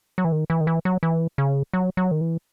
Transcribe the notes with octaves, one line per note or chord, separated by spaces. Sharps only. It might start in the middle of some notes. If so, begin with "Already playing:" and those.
F#3
E3
D#3
E3
D#3
E3
F#3
E3
C#3
F#3
F#3
D#3
E3